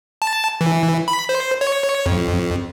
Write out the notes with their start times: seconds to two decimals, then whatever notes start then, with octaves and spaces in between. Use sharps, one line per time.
0.22 A5
0.61 E3
1.08 B5
1.29 C5
1.61 C#5
2.06 F2